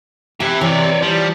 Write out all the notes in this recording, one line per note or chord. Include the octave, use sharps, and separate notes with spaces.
C3 G4 E5 G#5
E3 C#5 D5
F3 G3